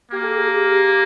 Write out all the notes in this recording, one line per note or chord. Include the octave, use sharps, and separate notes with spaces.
A#3 G4
A4
G#4
G4